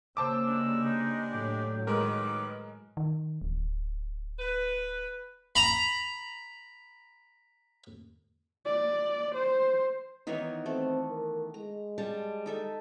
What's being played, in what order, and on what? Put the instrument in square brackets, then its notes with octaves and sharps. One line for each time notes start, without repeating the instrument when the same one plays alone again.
[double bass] C#3 A#3 [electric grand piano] C5 A5 D6 [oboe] E6
[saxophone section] G3 G#3 D4
[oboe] D#4
[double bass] A2 F#3 [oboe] G4
[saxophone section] D#3 B4 [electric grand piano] G#3 A#4 [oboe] D6
[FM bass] D#3
D1
[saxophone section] B4
[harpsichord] A#5 B5
[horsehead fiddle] D5
C5
[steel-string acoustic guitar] D#3 E3 B3 [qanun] D#4 C#5
[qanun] A3 A4 [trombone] C4
[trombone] A#4
[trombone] G#3 [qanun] A#5
[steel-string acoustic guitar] G3 [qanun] A5
[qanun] D#4 A4 E5